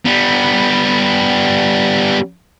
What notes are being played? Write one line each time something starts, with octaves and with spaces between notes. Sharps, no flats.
G3 B3